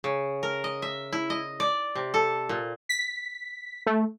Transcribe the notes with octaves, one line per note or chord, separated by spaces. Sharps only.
C#3
A#4
D#5
E5
E4
D#5
D5
C3
A4
A#2
B6
A3